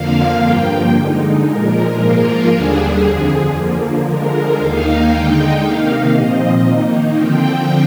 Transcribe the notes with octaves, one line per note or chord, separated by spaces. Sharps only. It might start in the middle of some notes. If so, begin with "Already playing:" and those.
Already playing: F2 D3 F3 A#3 F5
G2 F3 A#3 G5
D3 G#3 D#4
A#2 F3 G#3 A#4
G#2 F3 A#3 F4 A#4
D#2 D3 G3 D4 G#4
F2 D3 F3 G#4
D3 F3 A#3
D3 F3 G#3 A#4
D#2 D#3 A#3 D#4 F5
D3 G#3 D#4 G5
C3 D#3 A#3 D#4 F5
A#2 F3 C4 D#5
D#3 A#3 D#4
D3 F3 C4 G5